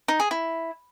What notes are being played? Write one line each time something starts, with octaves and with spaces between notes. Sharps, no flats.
D#4
G#4
E4